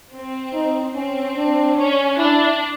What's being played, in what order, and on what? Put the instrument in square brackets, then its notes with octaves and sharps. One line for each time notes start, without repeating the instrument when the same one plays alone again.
[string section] C4
[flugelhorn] D#4
[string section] C4 [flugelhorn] C#4
[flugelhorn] D4
[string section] C#4
[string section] D4 [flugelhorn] E4